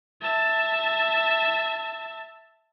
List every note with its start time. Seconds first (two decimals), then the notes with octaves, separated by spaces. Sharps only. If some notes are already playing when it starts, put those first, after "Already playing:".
0.21 E5 A5